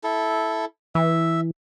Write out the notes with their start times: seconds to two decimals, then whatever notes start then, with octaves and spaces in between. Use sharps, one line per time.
0.04 E4 A4
0.95 E3 E5